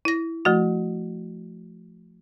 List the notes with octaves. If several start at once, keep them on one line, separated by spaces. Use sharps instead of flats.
E4 A#6
F3 A3 F#4